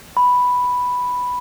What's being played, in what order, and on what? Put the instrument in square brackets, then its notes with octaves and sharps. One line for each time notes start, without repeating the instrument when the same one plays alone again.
[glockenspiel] B5